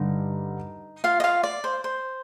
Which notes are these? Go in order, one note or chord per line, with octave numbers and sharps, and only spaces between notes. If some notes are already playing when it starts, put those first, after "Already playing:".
Already playing: G2 D3 D#4
F4 F5
D#5
F4 F5
D5
C5
C5